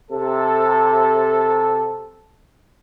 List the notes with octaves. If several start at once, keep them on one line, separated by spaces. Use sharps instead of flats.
C3 A4